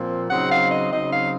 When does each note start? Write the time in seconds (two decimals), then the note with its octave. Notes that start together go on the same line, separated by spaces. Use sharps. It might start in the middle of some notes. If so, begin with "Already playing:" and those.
Already playing: A#2 F3 C4
0.30 C#3 F#3 C4 D#4 F#5
0.51 F5
0.70 D#5
0.91 C#3 F#3 C4 D#4 D#5
1.12 F5